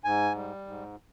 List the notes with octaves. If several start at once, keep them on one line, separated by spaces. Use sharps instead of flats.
G#2 G#5
G3
G#2